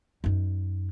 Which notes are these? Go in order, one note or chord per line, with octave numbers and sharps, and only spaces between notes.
F#2 D#4